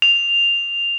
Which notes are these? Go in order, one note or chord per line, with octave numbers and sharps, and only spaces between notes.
F7